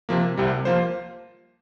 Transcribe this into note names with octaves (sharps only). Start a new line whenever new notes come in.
C3 F3 A#3
C2 C3 G3
F3 A#3 F4 C5